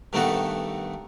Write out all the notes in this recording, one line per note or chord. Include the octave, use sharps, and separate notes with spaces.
G2 D#3 A3 B3 F#4 A4